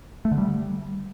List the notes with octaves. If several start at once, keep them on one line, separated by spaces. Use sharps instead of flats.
A3
D3
G3